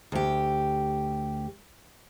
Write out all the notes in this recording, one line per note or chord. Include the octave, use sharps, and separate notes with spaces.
D2 G4